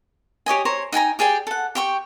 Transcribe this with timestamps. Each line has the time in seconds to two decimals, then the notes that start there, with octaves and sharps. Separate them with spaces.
0.46 G4 C#5 D#5 G#5
0.65 C5 C#5 A#5
0.92 D#4 G5 G#5 A#5
1.19 G4 G#4 D5 G5
1.47 A4 F#5
1.75 G4 G5 C#6